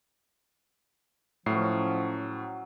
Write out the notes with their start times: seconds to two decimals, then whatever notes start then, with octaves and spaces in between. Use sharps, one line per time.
1.46 A2 F3 F#3 C#4 C7